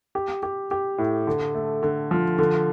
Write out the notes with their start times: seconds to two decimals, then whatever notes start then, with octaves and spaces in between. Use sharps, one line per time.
0.15 G4
0.43 G4
0.71 G4
0.98 A2
1.27 D3
1.55 A3
1.83 D3
2.11 F3
2.38 D3